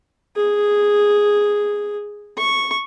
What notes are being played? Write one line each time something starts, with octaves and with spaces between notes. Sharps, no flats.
G#4
C#6